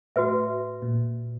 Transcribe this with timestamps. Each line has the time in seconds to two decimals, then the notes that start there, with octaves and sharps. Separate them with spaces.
0.16 A2 F#4 B4 E5
0.82 A#2